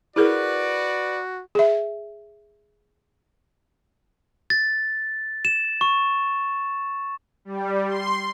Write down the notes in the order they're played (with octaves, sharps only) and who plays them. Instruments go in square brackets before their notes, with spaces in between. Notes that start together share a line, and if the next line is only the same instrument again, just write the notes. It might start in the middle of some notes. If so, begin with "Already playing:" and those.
[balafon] E4 G#4 A#4 [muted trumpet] F#4 [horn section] B4 D5
[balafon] G#4 E5
[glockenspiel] A6
E7
C#6
[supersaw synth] G3
C6